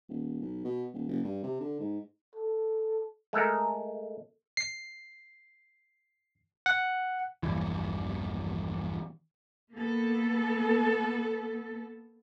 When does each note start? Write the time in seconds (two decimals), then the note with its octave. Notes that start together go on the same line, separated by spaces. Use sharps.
0.09 D#1
0.42 B1
0.65 B2
0.94 D#1
1.08 F#1
1.24 G2
1.43 C3
1.60 D3
1.80 G#2
2.35 A4
3.33 G#3 A3 A4 A#4
4.57 C7
6.66 F#5
7.43 A#1 E2 G2 E3
9.71 A#3 B3 A4